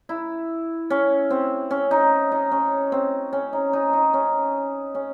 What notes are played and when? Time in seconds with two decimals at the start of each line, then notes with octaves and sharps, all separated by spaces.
0.09 E4
0.90 C#4
1.30 C4
1.71 C#4
1.91 D#4
2.32 D#4
2.51 C#4
2.92 C4
3.33 C#4
3.53 D#4
3.73 D#4
3.93 D#4
4.14 C#4
4.95 C#4